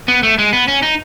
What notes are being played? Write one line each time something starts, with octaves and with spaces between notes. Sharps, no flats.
B3
A3
G#3
B3
C#4
D#4